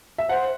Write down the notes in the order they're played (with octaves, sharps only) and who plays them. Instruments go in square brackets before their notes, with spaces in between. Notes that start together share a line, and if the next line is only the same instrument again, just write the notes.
[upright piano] E5
[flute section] C5 [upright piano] F#5